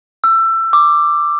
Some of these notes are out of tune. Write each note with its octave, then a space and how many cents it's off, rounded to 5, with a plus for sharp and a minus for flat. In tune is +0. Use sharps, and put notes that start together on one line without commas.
E6 +25
D6 +5